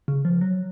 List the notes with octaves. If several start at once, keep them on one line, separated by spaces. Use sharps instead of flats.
C#3
F3
F#3